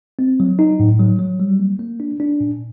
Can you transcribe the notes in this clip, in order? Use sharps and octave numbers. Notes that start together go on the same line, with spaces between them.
C4
F#3
D#4
A2
F#3
F#3
G3
A#3
A#3
D4
D4
A#2